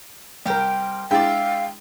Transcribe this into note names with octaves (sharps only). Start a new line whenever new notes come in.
C2 G4 A#4 C5 G5
G#3 D4 E4 D5 E5 F5 G5